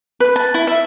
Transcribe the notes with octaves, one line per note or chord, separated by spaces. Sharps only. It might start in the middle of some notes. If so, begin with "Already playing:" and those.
B4
A5
E4
E5